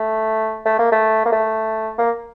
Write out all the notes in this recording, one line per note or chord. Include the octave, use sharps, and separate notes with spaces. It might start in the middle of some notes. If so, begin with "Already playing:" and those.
Already playing: A3
A3
A#3
A3
A#3
A3
A#3